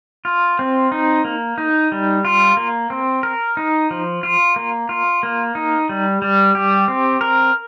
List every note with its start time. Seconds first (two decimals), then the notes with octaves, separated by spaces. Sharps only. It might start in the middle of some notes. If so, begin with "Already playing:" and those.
0.25 F4
0.59 C4
0.92 D#4
1.25 A#3
1.58 D#4
1.92 G3
2.25 F4
2.57 A#3
2.90 C4
3.23 A#4
3.57 D#4
3.91 F3
4.23 F4
4.56 A#3
4.89 F4
5.23 A#3
5.55 D#4
5.89 G3
6.22 G3
6.55 G4
6.88 C4
7.21 A#4